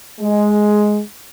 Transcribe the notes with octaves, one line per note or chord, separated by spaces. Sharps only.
G#3